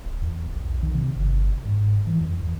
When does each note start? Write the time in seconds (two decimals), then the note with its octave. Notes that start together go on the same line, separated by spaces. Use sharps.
0.05 D1
0.22 E2
0.55 B1
0.83 D#3
0.95 C3
1.15 G1
1.65 G#2
2.07 E3
2.21 F2
2.43 E2